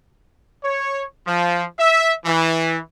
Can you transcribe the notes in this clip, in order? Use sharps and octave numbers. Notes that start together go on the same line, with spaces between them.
C#5
F3
E5
E3